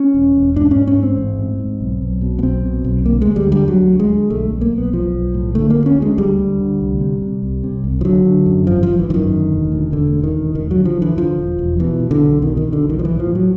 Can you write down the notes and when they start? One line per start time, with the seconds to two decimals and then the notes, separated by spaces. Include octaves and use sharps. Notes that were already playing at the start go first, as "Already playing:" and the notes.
Already playing: C#4
0.14 E1
0.35 E1
0.56 G#2 D4
0.71 G#2 C#4
0.87 C#4
0.97 G#2
1.03 C4
1.18 A1
1.39 G#2
1.60 G#2
1.81 B1
2.02 B1
2.22 B2
2.39 B3
2.43 B1 C4
2.64 B2
2.84 B1
3.05 D2 A#3
3.22 D2 G#3
3.36 G3
3.47 D3 G3
3.67 D2 F#3
3.88 D2
4.00 G#3
4.10 D2
4.30 B1 A3
4.52 B1
4.61 A#3
4.72 B1
4.78 B3
4.93 B1 F3
5.14 B1
5.34 A2
5.55 D3 A3
5.70 A#3
5.76 D2
5.86 C#4
5.96 D2
6.02 G#3
6.18 D2 G3
6.39 D2
6.60 D3
6.81 C2
7.01 C3
7.22 C3
7.43 C2
7.64 C3
7.84 C2
8.01 F3
8.05 D3 F#3
8.26 D3
8.46 F#2
8.67 G#1 F3
8.83 F3
8.88 G#1
8.99 E3
9.10 F#2 E3
9.14 D#3
9.29 D2
9.51 E1
9.72 D2
9.92 E1 D3
10.13 D2
10.24 D#3
10.35 E1
10.55 E1 D#3
10.71 F#3
10.76 D3
10.85 F3
10.97 D3
11.02 E3
11.17 D3 F3
11.39 E1
11.59 E1
11.80 B2 E3
12.00 B2
12.11 D3
12.21 B1
12.42 B2 D#3
12.57 D#3
12.64 B2
12.73 D3
12.84 B1
12.89 D#3
12.99 F3
13.04 A1 E3
13.20 F3
13.26 A2
13.35 F#3